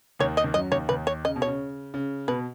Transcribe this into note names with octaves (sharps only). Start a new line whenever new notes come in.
D#2 D#3 C#5
D#5
D#3
F#2 F#3 D#5
D#2 D#3 C#5
D#2 D#3 B4
C#5
C#3 D#5
B2
C#5
C#3
C#3
B2 B4